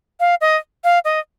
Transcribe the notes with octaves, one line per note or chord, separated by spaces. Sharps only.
F5
D#5
F5
D#5